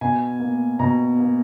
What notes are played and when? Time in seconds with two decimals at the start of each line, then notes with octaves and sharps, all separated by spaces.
0.01 B2 G#5
0.40 A#3
0.79 B2 A#5
1.19 A#3